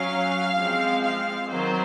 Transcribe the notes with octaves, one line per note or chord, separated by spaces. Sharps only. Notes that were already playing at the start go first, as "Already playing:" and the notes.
Already playing: F#3 C#4 F5
F3 G#3 C4
F5
D#3 F#3 C4 C5